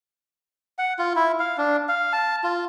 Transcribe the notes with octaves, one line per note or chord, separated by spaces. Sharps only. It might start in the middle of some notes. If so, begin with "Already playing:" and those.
F#5
F4
E4
F5
D4
F5
A5
F4